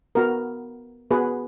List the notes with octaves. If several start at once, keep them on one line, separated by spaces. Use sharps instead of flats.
B3 F#4 A#4
B3 F#4 G#4 B4